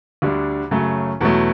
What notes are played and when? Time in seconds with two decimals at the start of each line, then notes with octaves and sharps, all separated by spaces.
0.22 D2 D3 G3 D4
0.71 F#2 C#3 F#3 A3
1.21 E2 B2 F#3 A3